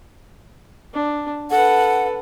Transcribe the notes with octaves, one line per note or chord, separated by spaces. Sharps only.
D4
A4 B4 F#5